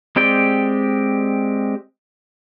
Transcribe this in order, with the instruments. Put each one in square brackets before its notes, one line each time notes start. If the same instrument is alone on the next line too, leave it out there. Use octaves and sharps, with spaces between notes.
[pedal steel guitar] G#3 C4 G4 D5 G5